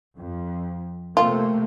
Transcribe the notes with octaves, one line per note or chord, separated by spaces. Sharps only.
F2
C3 A3 A#3 F4